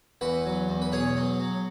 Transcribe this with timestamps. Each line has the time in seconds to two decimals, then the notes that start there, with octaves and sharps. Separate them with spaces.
0.21 E2 F#4 B4
0.45 F#3
0.69 E2
0.82 B4
0.92 B2 G#4 C#5
1.17 F#3
1.40 F#3